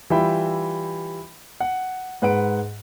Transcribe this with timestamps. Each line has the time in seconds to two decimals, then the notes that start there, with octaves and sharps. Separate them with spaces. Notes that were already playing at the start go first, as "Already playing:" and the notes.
0.10 E3 G3 F4 E5 G5 B5
1.60 F#5
2.22 G#2 B4 F#5 D7